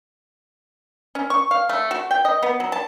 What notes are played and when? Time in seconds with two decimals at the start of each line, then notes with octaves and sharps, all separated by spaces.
1.15 C#4
1.30 C#6
1.51 F5
1.69 A3
1.91 F#4
2.11 G5
2.25 D#5
2.43 B3
2.60 F#3
2.72 A5